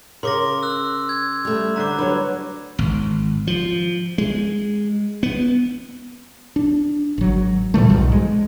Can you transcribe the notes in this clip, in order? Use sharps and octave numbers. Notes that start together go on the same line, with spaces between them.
C#3 A#4 C6 D6 A#6
E6 F#6
G#6
G3 A3
D3 B4 C5 A#5 D6
G2 F#3 B4 C#5
G#1
F3
G#3
B3
D4
G#1 F#3
A#2 E3 G3 A3
B1 G#2
G#3